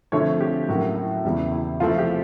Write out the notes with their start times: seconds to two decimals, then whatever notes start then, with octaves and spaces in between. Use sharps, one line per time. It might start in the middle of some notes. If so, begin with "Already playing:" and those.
0.12 D3 F3 A3 C4 C#5
0.41 G4
0.68 A2 F#3 A#3 C#4 F#4
0.96 E4
1.25 E2 C#3 E3 G3
1.52 E4
1.80 C3 F3 A3 C4 F4
1.98 G4